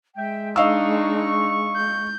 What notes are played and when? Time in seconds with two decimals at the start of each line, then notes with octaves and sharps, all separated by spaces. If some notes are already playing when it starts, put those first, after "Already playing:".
0.16 G#3 E5 G5
0.56 D4 D#4 D#5 F5 C#6 E6
1.76 G6